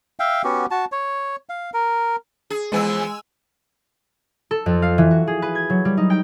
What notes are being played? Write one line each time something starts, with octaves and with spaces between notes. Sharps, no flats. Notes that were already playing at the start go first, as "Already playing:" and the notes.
E5 F5 G5
B3 C#4 F#4 G4
F#4 A5
C#5
F5
A#4
G#4
F2 E3 G#3 B3 G#5 E6
A4
F2
F5
E3
F#4
G#4
B4
G#6
F#3
G3
D#4
G5